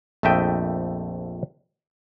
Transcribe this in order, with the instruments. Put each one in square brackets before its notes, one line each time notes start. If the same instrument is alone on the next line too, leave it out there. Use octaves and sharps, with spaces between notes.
[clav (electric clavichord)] A#1 F2 A3 D#5 E5 G5